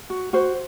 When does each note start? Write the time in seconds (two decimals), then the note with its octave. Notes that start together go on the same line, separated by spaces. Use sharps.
0.10 F#4
0.33 F#4 C5